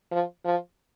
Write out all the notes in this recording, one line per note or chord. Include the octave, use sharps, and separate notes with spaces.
F3
F3